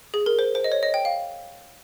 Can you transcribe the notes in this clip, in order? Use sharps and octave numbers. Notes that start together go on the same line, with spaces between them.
G#4
A#4
C5
C5
D#5
C#5
D#5
G5
F5